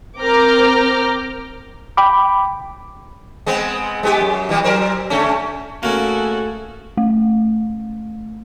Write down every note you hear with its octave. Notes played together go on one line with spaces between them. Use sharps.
C4 A#4 A#5 D6 F6 G6
G5 B5 D6
G#3 B3 C4
G#3 B3 G4
F#2
B2 E3 G3
F#3 A#4 C5
C#3 A3 C#4
C#3 A3 A#3 C#4 F#4 G#4 A4
A3